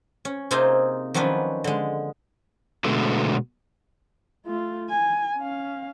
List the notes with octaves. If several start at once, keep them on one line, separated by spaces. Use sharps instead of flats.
C#4
C3 A#3 C4 D#4 F4 G#4
D#3 F3 F#3 C#4 D4 B4
D3 G#3
B2 D3 G#3 A3 B3 F#4
A3 F4
G#5
C#4 F5